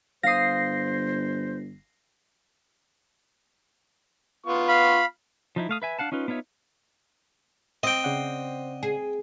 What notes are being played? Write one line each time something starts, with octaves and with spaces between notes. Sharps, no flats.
G1 C5 F5 D#6 A#6 C7
B3 F4 C#6
F5 B5
F3 D#4 E4
A3 F5 D#6
B4 E5 G#5
D4 F5 F#5 A5
C#4 D#4 F4 B4
B3 D#4 F4 C#5 E5
C4 D#5 G5
C#3 D5 F#5
G#4